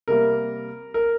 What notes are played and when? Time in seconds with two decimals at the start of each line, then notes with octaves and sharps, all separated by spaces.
0.08 C3 G3 A#3 A#4
0.94 A#4